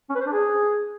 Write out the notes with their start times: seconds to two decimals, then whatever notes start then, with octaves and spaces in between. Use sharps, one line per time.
0.10 C#4
0.15 B4
0.21 C5
0.26 D4
0.32 G#4